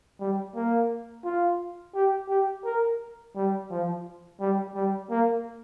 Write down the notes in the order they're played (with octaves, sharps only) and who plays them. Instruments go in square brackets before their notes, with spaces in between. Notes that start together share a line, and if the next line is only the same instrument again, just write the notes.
[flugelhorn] G3
A#3
F4
G4
G4
A#4
G3
F3
G3
G3
A#3